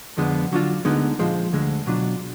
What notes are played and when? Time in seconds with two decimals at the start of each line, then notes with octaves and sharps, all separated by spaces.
0.17 F2 D3 F3 G#3 B3
0.52 D3 F#3 D4 F4
0.85 D2 D3 G#3 B3 D#4
1.19 A#2 F3 G#3
1.53 D2 D3 G#3
1.87 B2 F#3 D4 F4